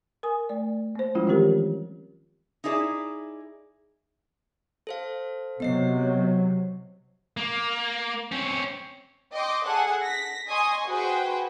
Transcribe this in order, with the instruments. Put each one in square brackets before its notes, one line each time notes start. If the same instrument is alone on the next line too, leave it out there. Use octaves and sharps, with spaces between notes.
[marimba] A#4 G#5 D#6
A3 D5
A#3 C5
F3 G3 G#3 C#4 E4 F4
D#3 E3 C4 G4 A#4
[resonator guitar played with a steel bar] D#4 E4 G#4 D5
[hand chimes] A4 C5 F5
[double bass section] C3 F#3 [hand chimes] B3 D#5 C7
[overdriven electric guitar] A#3
C4 C#4
[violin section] D#5 G5 C6 D6
G#4 A4 F#5 G#5
A#6 B6
D#5 G#5 C6 C#6 D#6
F#4 G#4 B4 C5 F#5 G5